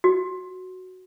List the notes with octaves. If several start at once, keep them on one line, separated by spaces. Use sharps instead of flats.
F#4